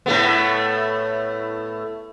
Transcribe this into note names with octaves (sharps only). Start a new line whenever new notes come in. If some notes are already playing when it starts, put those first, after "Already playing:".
A2 A3 B3